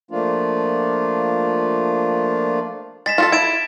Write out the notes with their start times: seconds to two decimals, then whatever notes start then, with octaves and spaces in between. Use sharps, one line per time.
0.11 F3 A3 A#3 D4 F4
3.06 G#3 A6 B6 E7
3.18 F4 F#4 A4
3.32 E4 G#6 D7 E7